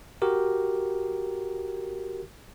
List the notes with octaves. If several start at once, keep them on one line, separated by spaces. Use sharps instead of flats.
F#4 G4 A#4